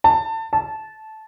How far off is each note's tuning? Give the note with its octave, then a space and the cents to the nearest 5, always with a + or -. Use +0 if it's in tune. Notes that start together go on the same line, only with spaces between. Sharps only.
A5 +25
A5 -15